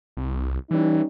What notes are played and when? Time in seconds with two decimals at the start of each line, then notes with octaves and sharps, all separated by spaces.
0.17 C2
0.71 E3 G3 C#4 D#4